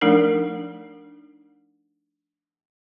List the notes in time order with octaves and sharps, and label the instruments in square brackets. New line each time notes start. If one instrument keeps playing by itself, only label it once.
[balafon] F3 A3 D4 D#4 A#4